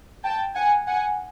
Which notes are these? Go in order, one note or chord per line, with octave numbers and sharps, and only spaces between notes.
G5 A5
F#5 G#5
F#5 G#5